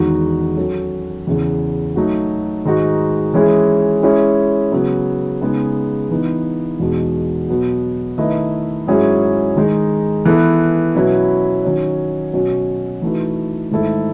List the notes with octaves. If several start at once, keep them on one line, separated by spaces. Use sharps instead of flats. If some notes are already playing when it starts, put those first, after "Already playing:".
Already playing: E2 D#3 G#3 D#4 F#4
F#3 C#4 F#4 A4
E2 C#3 E3
F#3 A3 D#4 F#4
G#2 D#3 G#3 D#4 F#4
E3 G#3 C#4 E4 G#4
G#3 C#4 E4 G#4
C#3 F#3 B3
C#3 G#3 B3 D#4 G#4
E3 B3 D#4
E2 B2 G#3 B3 D#4
B2 F#3 B3
D#3 A3 E4 B4 D#5
G#2 F#3 C#4 E4 G#4
D#3 G#3 D#4
E3 B3 E4 A4
B2 F#3 C#4 E4 B4
D#3 F#3 C#4
B2 F#3 C#4
E3 A3 D#4 F#4 B4
G#2 D#3 A3 E4 A4